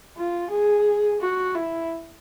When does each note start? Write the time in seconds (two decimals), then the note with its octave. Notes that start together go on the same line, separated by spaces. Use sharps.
0.16 F4
0.50 G#4
1.21 F#4
1.55 E4